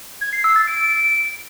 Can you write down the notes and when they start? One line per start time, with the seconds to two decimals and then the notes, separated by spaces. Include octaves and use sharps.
0.21 G#6
0.33 C7
0.44 E6
0.56 A6
0.67 D7